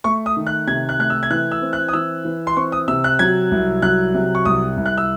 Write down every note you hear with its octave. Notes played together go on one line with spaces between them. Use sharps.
A3 C#6
D#6
D#3
F#6
C3 G#6
F#6
A3 F#6
E6
G#6
E3 F#6
E6
C4
F#6
D#6
E3 E6
E3
C6
C4 C#6
D#6
C3 E6
F#6
F#3 G#6
C2
F#3 F#6
C3
C#6
C2 D#6
C2
F#6
E6